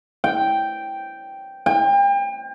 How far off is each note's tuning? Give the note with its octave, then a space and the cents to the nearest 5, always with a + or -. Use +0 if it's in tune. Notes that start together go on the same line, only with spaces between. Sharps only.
G5 -5
G5 +35